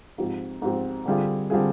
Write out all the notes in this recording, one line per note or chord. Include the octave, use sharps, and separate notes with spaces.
G#2 F3 C4 G4
G#2 F3 C4 G4
D3 G3 C4 F4 G#4
D3 G3 C4 F4 G#4